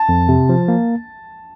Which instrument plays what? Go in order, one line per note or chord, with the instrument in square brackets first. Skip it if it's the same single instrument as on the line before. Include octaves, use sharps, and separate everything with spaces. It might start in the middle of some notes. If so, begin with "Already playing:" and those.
Already playing: [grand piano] A5
[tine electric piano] F2
C3
F3
A#3